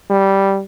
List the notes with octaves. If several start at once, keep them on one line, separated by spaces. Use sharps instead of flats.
G3